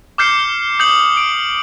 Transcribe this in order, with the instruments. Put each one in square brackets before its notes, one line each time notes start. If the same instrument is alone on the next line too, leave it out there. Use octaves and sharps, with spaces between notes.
[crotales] D6 F6 G6 C7 C#7 G7
D#6 G6 C#7 F#7
D7